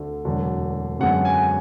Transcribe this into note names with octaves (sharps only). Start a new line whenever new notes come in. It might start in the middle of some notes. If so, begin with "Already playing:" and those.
Already playing: D2 D3 A3
E1 E2 D3 F#3
F#2 D3 G#3 B3 F#5
G#5